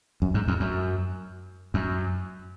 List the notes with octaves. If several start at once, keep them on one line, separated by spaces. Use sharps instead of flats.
F#2
G#2
F2
F#2
F#2